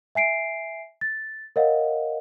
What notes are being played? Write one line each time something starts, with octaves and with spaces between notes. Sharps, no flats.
E5 G#5 C7 D7
A6
A#4 C#5 D#5 F5 F#5